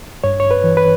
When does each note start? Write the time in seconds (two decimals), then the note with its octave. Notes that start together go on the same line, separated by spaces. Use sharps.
0.24 G2 C#5
0.40 C#5
0.51 B4
0.64 E3
0.77 B4